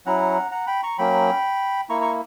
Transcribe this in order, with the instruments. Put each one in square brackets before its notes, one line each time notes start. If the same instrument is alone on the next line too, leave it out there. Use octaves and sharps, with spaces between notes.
[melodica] F#3 C#4 E4 F#5 A#5
F#5 A#5
G5 B5
A#5 C#6
F#3 A#3 C#4 G5 B5
A#3 E4 A#5 C#6
A#5 C#6